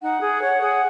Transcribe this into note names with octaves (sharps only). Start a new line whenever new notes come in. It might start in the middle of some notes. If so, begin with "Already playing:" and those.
D#4 F#5
G#4
C#5
G#4